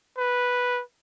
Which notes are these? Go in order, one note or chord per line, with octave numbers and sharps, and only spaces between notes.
B4